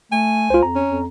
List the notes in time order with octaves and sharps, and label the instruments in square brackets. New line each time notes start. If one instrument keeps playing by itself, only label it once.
[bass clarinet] A3 [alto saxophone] G#5
[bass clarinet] C#2 [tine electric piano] F4 C5
[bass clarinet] F2 [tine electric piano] A#5
[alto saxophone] C#4
[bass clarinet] F2